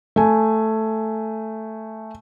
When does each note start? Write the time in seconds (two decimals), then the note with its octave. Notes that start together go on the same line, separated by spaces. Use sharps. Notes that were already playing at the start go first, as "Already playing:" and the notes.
0.16 A3 G#5